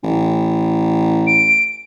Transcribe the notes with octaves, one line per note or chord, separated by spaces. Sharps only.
A1
D7